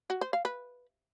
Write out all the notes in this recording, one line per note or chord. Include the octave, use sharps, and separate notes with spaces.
F#4
C5
F5
B4